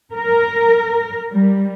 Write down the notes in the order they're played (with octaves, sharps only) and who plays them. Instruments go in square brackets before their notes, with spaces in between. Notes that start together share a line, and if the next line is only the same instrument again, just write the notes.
[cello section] A#4
G3